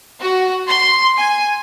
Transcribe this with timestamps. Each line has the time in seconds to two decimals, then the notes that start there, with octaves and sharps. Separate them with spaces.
0.20 F#4
0.68 C6
1.19 G#5